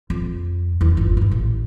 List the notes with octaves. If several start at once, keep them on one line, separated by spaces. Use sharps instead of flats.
F2
E2
G1 F4
A1 E3
A1